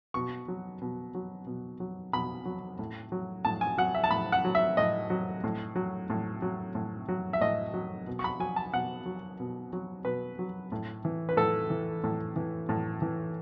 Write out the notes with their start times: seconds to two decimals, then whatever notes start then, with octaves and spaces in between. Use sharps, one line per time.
0.14 B2 C#6
0.48 F#3
0.82 B2
1.15 F#3
1.47 B2
1.80 F#3
2.13 B2 B5
2.45 F#3
2.79 A2
3.12 F#3
3.45 A2 A5
3.61 G#5
3.78 F#3 F#5
3.95 E5
4.04 A5
4.11 A2 B5
4.32 F#5
4.45 F#3
4.55 E5
4.77 A2 D#5
5.10 F#3
5.44 A2
5.76 F#3
6.10 A2
6.42 F#3
6.75 A2
7.09 F#3
7.33 E5
7.41 A2 D#5
7.74 F#3
8.07 B2
8.19 C#6
8.24 B5
8.40 F#3 G#5
8.56 A5
8.73 B2 F#5
9.06 F#3
9.40 B2
9.73 F#3
10.05 B2 B4
10.39 F#3
10.72 A2
11.05 E3
11.29 B4
11.37 A2 A4
11.70 E3
12.04 A2
12.36 E3
12.69 A2
13.02 E3